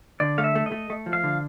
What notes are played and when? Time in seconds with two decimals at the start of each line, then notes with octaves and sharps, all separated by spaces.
0.20 D3 D5
0.38 A3 F5
0.44 E5
0.55 A3
0.66 D#5
0.72 A3
0.90 A3
1.06 F3
1.13 F5
1.24 D3